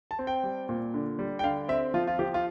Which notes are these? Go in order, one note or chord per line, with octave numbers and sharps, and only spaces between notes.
A5
C4
G5
G3
A#2
D3
G3
G5
D3 F5
C4 E5
F3 F4
F4
F3 G4
F4